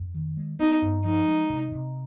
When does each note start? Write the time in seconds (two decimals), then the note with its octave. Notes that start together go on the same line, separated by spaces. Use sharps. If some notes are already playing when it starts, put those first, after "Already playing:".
Already playing: F2
0.14 D#3
0.37 G#3
0.59 B3 D#4
0.82 G2
1.05 F3 D#4
1.27 G#3
1.50 C3
1.72 C3